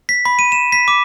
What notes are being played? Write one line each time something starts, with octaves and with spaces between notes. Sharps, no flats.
B6
B5
D#7
E7
B6
D6